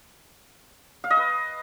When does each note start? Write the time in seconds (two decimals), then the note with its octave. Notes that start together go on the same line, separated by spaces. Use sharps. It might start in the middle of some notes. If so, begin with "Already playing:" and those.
1.04 F5
1.10 D#5
1.17 B4